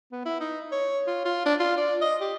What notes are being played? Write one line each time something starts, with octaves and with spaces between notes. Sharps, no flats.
B3
E4
D#4
C#5
F4
F4
D4
F4
D5
D#5
G4